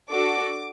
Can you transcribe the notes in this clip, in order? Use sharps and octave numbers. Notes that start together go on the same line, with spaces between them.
D4 F#4 A4 D6